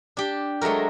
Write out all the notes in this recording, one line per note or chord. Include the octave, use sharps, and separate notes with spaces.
D4 G4
F#3 G#3 A3 F#4 A#4